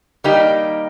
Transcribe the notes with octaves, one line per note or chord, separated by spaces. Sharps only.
D#3 G3 A#3 D#4 G4